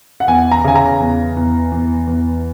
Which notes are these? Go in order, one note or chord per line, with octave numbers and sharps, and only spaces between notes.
F#5
E2 G#5
A#5
C#3 G#5
A#5
E2
E2
E2
E2